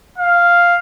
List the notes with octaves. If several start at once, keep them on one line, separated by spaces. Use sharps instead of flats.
F5